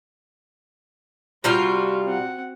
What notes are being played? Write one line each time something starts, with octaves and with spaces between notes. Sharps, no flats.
C3 G3 F4 F#4 F5
C4 F#5